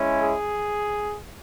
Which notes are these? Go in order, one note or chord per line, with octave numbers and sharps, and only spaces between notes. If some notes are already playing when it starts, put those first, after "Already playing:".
Already playing: G#3 C#4 E4
G#4